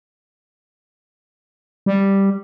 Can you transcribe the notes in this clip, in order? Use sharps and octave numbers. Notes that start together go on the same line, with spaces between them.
G3